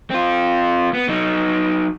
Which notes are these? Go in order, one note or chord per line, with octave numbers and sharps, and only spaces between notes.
C4 F4
B3
F#3 D#4